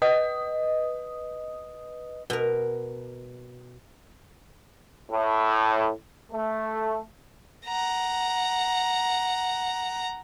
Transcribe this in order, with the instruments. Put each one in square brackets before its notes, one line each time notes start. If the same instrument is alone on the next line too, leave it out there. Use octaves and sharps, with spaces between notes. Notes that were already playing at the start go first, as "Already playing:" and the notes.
[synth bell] B4 D#5 D#6
[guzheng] B2 A#4
[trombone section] A2
A3
[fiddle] F#5 A#5